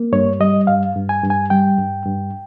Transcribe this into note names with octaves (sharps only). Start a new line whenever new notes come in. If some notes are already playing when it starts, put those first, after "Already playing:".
Already playing: A#3
G2 C#5
G3 D#5
G2 F5
G2
G#5
G2
G#5
G3 G5
G2
G2